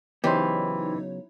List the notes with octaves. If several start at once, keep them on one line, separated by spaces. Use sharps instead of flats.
C#3 E3 F#3 B3 D#4 G4 C5 C#5